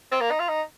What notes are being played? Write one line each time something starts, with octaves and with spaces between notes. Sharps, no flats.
C4
A#3
D#4
F4
D#4